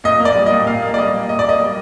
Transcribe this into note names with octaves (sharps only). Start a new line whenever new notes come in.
A#2 D#5
A#3
D5
G3
D#5
A#2
A#2 F5
A#3
D5
G3 D#5
A#2
A#2 D#5
D5
A#3 D#5
G3